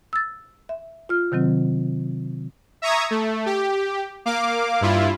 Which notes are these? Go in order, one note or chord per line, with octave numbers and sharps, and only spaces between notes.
E6 A6
E5
F4 F6
C3 D#3 F#3 C4
E5 A#5 C#6 D#6 G#6
A3
G4
A#3 F5 D6
G2 E4 F4